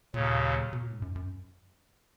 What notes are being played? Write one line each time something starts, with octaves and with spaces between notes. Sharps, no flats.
D#2 A#2 C#3 F#3
B2
A#2
G#2
F#2
F#2